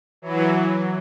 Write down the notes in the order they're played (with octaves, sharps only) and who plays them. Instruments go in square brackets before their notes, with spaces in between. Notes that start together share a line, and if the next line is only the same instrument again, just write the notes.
[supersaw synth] E3 F#3